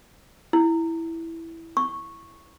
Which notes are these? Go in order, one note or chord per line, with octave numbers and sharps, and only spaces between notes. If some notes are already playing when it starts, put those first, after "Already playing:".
E4
C#6